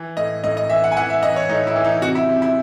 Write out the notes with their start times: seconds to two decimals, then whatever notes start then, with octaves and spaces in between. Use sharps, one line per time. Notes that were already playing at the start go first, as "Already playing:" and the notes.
Already playing: E3
0.17 A2 D#5
0.44 A2 D#5
0.57 D#5
0.69 E3 E5
0.84 F#5
0.92 G#5
0.97 E3 F#5
1.10 E5
1.23 E3 D#5
1.36 C#5
1.49 A2 D#4
1.67 E4
1.76 E3
1.84 D#4
2.02 C3 F#4
2.15 E4
2.29 C3
2.42 E4